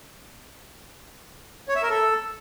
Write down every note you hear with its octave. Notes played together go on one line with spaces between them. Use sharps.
C#5
E5
A#4
A4